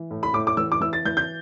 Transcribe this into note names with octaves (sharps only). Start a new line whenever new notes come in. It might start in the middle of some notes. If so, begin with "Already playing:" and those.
Already playing: E3
A2
B5
A2 D6
D6
E3 E6
D6
E3 E6
A6
E3 G6
G6